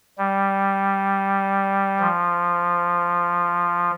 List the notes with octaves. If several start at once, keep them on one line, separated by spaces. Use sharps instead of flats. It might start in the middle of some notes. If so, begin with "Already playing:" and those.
G3
F3